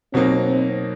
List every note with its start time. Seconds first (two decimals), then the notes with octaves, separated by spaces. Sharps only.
0.13 B2 F#3 A#3 C4 D#4
0.45 C4